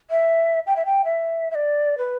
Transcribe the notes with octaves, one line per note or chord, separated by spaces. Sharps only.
E5
G5
E5
G5
E5
E5
D5
B4